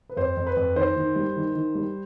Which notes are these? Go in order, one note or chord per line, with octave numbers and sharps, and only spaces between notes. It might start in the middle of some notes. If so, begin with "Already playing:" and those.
B4
F2 C5
F2
B4
F2
D#3 C5
D#3
G3
D#3
D#3
G3